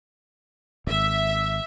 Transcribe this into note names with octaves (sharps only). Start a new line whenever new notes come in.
D#1 G#1 E5